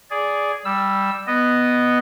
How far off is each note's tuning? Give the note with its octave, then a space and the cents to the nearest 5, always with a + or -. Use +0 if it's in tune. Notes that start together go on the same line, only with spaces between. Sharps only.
G#4 +0 D5 -10
G3 +0 E6 +0
B3 +0 D#5 -10